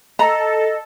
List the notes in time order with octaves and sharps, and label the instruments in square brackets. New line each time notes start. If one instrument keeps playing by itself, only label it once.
[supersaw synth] A4 [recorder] D#5 [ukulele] A#5